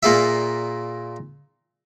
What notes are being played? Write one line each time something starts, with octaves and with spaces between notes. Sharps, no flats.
A#2 A#3 G#4 D5 E5